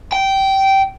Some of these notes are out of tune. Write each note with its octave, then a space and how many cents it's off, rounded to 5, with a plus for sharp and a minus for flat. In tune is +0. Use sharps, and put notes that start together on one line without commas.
G5 -15